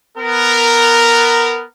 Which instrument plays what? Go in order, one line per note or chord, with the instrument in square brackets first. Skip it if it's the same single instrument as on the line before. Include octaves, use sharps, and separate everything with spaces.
[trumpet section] B3 A#4